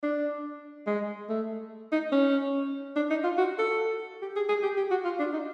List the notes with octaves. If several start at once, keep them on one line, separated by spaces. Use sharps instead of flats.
D4
G#3
A3
D#4
C#4
D4
D#4
F4
F#4
A4
G4
G#4
G#4
G4
G4
F#4
F4
D4
D#4